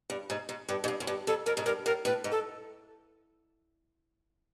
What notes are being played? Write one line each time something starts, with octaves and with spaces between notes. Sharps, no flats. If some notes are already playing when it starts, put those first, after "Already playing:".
G2
G#2
G#2
G2
G#2
G2
F#2
G2
F2 A4
F2 A#4
G#2
G2 A#4
A2 A#4
A2 B4
G#2
A4